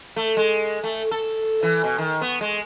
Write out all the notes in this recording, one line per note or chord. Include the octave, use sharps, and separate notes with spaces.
A3
G#3
A3
A4
E3
B2
D#3
B3
G#3